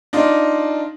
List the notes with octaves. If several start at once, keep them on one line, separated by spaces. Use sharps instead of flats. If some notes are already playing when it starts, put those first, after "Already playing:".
D4 D#4 F4